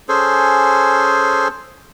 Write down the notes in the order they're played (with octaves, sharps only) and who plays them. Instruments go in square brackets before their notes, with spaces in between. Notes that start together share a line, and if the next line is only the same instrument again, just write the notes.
[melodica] C#4 G#4 A4 C5